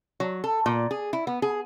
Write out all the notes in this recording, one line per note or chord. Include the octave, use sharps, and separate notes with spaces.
F#3
A4
A#2
G#4
E4
B3
G#4